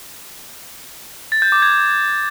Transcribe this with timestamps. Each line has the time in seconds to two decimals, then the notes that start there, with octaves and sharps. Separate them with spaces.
1.32 A6
1.42 G6
1.52 D6
1.62 G#6